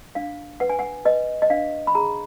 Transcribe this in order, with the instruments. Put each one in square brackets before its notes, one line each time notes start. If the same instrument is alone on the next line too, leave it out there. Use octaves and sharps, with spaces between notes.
[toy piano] D4 F5
B4 F#5
G#5
F#5
B4 D#5
D#5
D4 F5
B5
G#4 A#5